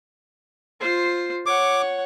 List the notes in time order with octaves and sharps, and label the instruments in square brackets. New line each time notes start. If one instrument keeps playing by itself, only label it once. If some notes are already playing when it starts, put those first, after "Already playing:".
[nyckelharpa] F4 C5
[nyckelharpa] C#5 F#5 [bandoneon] D6